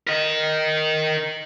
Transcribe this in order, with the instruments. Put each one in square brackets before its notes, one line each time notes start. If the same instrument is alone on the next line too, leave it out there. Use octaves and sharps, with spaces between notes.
[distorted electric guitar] A#4 D#5